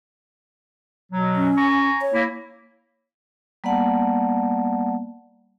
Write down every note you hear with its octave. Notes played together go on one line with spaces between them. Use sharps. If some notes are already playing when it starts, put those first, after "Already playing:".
B2 F#3
C#4
G#5 A#5 C#6
C#5
A#3 E4
G3 A#3 B3 D5 F#5 A5